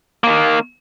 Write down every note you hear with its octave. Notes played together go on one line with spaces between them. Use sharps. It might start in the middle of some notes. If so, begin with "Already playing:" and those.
D#3 A#3